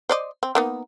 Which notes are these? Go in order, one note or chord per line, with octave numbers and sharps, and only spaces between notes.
C5 D5 D#5
C4
A#3 B3 D#4